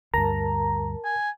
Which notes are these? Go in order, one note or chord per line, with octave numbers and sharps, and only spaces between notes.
D2 G2 A#4 A5 A#5
G#5